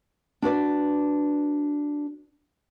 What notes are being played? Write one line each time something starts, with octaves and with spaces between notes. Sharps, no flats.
D4 F#4 B4 D5